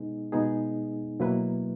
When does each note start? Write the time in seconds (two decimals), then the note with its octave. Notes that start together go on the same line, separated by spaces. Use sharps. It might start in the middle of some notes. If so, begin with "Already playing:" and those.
Already playing: B2 G#3 B3 D#4 G#4
0.32 B2 G#3 B3 D#4 G#4
1.20 B2 F#3 A#3 E4 B4